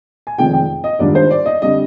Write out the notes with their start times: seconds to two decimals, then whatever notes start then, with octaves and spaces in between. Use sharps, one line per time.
0.27 G#5
0.38 F1 F2 D#3 G#3 G5
0.54 G5
0.84 D#5
0.99 G#2 D#3 G3 D4 F4 D5
1.15 C5
1.31 D5
1.46 D#5
1.62 D3 G3 C4 D#5